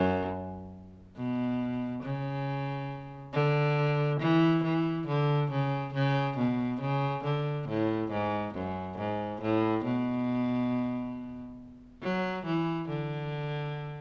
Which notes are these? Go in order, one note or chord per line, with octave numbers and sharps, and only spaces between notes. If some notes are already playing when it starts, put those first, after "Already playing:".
Already playing: F#2
B2
C#3
D3
E3
E3
D3
C#3
C#3
B2
C#3
D3
A2
G#2
F#2
G#2
A2
B2
F#3
E3
D3